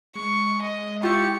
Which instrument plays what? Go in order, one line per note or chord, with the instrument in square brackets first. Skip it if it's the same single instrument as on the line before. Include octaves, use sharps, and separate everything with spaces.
[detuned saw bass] G#3 [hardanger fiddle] C#6
[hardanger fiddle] D#5
[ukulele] E4 F4 [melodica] G4 [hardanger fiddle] C#6